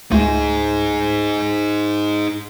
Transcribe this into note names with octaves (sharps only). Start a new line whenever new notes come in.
C#2 G#3 A3 D#4 G#4